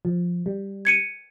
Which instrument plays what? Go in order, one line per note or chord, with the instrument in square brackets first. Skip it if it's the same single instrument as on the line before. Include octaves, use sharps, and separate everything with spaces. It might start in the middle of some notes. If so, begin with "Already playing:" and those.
[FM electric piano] F3
G3
[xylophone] G#6 C#7 D#7